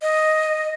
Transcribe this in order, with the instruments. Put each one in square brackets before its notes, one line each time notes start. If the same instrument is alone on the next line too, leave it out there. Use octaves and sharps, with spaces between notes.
[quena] D#5